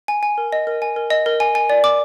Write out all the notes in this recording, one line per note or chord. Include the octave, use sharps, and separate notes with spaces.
G#5
G#5
A#4
D#5
A#4
G#5
A#4
D#5
A#4
G#5
G#5
D5
D6